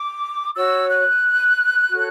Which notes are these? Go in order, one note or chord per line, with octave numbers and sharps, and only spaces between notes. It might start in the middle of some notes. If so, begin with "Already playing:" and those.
Already playing: D6
F#4 C#5 E6
F#6
F#4 A4 C#5